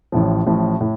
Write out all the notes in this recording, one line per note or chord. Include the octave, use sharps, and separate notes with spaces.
A1 A2 F3
A1 A2 F3
A2